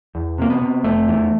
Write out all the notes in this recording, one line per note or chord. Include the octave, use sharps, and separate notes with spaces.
E2
C3 A#3
B3
C3
F1 A3
E2